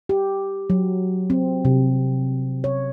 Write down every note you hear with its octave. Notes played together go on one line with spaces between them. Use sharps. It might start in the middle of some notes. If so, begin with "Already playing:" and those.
G4
F#3
C4
C3
C#5